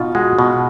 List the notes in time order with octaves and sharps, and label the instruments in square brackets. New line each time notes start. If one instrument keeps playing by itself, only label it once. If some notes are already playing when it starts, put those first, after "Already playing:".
Already playing: [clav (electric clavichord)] B2 [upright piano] D#4 F4
[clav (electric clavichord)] G#3 [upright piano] F#4
[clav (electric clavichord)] B2